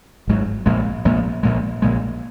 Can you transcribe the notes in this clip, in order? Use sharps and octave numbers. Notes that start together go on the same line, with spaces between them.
G#1 G#2 F#3
A#1 A#2 G#3
A#1 A#2 G#3
A#1 A#2 G#3
A#1 A#2 G#3